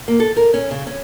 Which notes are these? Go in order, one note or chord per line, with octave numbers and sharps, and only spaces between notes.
A#3
A4
A#4
C#4
C#3
C#4